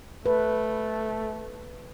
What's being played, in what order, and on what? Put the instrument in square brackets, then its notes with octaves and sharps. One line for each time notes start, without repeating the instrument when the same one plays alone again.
[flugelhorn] A3 [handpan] B4